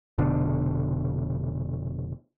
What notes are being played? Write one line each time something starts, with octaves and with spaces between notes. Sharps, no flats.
F1 B2 D3